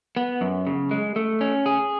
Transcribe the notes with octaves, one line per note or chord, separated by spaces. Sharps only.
B3
F#2
C#3
G#3
A3
C#4
G#4